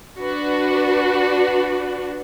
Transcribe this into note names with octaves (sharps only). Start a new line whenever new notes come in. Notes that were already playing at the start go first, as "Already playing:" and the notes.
D4 F#4 B4